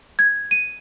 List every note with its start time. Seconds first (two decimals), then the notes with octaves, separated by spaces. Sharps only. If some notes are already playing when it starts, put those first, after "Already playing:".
0.19 G#6
0.51 D#7